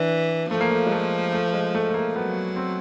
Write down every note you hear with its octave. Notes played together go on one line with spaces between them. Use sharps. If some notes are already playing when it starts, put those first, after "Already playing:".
Already playing: E3 D4
F3 A3
A#3
A3
G#3
A3
A3
G#3
A3
A3
A#3
F#3 B3
C4